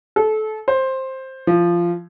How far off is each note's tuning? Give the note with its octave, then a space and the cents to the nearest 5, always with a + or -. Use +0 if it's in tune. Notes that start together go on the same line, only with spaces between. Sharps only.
A4 -25
C5 +10
F3 -15